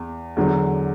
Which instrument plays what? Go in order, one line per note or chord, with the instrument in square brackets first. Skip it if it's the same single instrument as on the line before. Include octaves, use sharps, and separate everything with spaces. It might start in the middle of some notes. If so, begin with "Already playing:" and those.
Already playing: [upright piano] E2
E2 D3 F#3